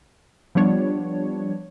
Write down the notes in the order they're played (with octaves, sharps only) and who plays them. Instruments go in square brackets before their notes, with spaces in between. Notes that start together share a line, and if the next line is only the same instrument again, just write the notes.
[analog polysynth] F3 G3 B3 D4 C#5